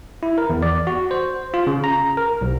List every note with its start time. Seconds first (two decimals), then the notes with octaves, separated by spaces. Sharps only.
0.23 E4
0.38 A#4
0.50 E2
0.63 D5
0.87 F#4
1.11 C5
1.54 F4
1.67 C#3
1.84 A#5
2.17 A#4
2.41 B1